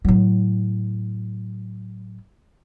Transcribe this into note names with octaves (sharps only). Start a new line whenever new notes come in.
A2 F#3